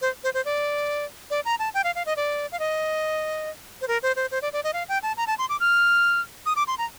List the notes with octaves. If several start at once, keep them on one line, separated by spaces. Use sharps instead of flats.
C5
C5
C5
D5
D5
A#5
A5
G5
F5
F5
D#5
D5
F5
D#5
C5
A#4
C5
C5
C5
D5
D5
D#5
F5
G5
A5
A#5
A5
C6
D6
F6
D#6
D6
C6
A#5